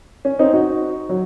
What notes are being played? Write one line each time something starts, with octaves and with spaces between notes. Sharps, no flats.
C#4
C4 D#4
D#4 F#4
F#3